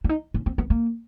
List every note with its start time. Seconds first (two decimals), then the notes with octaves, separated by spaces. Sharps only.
0.04 D4
0.09 D#4
0.34 C#4
0.46 C4
0.58 B3
0.70 A#3